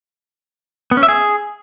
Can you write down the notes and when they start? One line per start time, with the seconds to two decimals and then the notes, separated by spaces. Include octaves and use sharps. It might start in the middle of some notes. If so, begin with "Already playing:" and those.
0.91 B3
0.97 C#4
1.03 E5
1.08 G#4